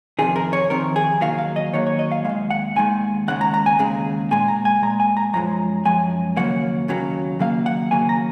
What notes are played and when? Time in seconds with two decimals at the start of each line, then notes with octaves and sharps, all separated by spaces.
0.19 F2 C3 D#3 G#4
0.36 A#4
0.53 C#5
0.70 F2 C3 D#3 A#4
0.96 G#4
1.21 D#2 D#3 F#3 A#3 F5
1.38 F5
1.56 D#5
1.73 D#2 D#3 F#3 A#3 C#5
1.87 C#5
1.99 D#5
2.12 F5
2.25 D#3 G#3 F5
2.29 D#2
2.51 F#5
2.76 D#2 D#3 G#3 G#5
3.28 D#2 C#3 G#3 F#5
3.41 A#5
3.54 A#5
3.66 G#5
3.79 D#2 C#3 G#3
4.31 A#2 G#3 G#5
4.48 A#5
4.65 G#5
4.82 A#2 G#3 A#5
5.00 G#5
5.17 A#5
5.33 F#2 F3 G#3 A#5
5.85 F#2 F3 G#3 G#5
6.37 D#2 C#3 F#3 A#3 F#5
6.88 D#2 C#3 F#3 A#3
7.39 D#2 C#3 F#3 A#3 F5
7.66 F#5
7.91 D#2 C#3 F#3 A#3 G#5
8.09 A#5